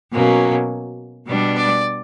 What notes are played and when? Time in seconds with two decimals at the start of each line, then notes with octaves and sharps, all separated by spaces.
0.12 B2 F#3 A#3 C#4
1.27 B2 G3 B3 D4
1.56 D5